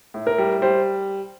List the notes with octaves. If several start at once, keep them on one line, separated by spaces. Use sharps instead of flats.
A2
A#4
G3
G3 C5